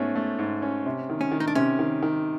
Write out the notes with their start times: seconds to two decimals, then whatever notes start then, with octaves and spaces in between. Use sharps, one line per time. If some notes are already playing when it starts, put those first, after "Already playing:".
Already playing: G#2 A3 B3 C#4
0.15 A3
0.39 G#2
0.62 C#4
0.86 C3
1.10 D#3
1.21 C#4
1.32 D#3
1.40 D#4
1.48 D4
1.55 C3 C#4
1.79 D#3
2.02 D#3